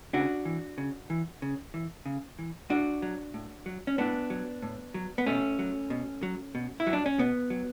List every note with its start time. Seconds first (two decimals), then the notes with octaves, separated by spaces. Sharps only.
0.13 C#3 D4 F#4
0.45 E3
0.78 C#3
1.10 E3
1.42 C#3
1.74 E3
2.06 C#3
2.39 E3
2.70 A2 D4 F#4
3.02 F#3
3.34 A2
3.66 F#3
3.87 C#4
3.98 A2 B3 D4
4.30 F#3
4.63 A2
4.94 F#3
5.18 B3
5.26 B2 A3 C#4
5.59 F#3
5.90 B2
6.23 F#3
6.55 B2
6.80 E4
6.87 F#3
6.93 D4
7.06 C#4
7.19 B2 B3
7.50 F#3